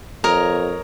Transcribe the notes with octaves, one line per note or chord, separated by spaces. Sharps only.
F2 A#4 C#5 D#5